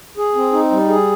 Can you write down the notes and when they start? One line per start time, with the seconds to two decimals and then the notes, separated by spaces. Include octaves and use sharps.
0.17 G#4
0.35 C4
0.53 D#4
0.71 G3
0.88 G#4